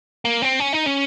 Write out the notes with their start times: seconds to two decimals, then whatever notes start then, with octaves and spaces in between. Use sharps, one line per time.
0.25 A#3
0.42 C4
0.60 C#4
0.73 D#4
0.86 C#4